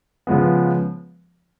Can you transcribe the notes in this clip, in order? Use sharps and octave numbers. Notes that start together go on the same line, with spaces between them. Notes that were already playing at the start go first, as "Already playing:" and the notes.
C#3 F3 G#3 B3